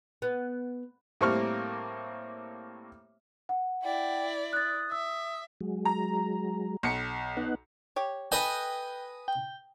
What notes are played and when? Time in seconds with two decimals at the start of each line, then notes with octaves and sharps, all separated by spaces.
0.22 B3
1.21 A2 G3 A#3 C4 C#6 F6
3.49 F#5
3.83 E4 D5 G5
4.53 D#6 F#6 A6
4.92 E5 E6
5.61 F#3 G#3
5.85 A#5
6.83 B1 C#7
7.37 B3 D#4 F#5
7.96 G4 C#5
8.32 A4 B4 D#5 G5 G#5
9.28 G5